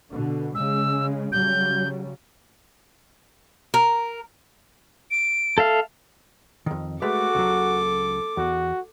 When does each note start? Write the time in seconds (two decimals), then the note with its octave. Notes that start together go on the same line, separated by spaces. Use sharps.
0.11 B2 D3
0.55 C#3 G#3 E6
1.32 C#3 F#3 G3 G6
3.74 A#4
5.11 D7
5.58 A4 E5 F5
6.66 F2 D#3
7.02 G#3 A3 F#4 A4 B4 D6
7.35 C#2 F#3
8.37 E2 F#4